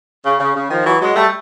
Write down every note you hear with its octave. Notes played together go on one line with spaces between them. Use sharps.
C#3
C#3
C#3
D#3 F3
E3 F#3
F#3 G#3
G3 A3